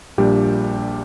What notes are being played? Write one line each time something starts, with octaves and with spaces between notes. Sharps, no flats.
A#1 A#2 G3 D4 G4